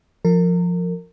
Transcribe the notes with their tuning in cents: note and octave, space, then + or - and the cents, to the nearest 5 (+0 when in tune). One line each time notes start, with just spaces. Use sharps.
F3 +0 A#4 -30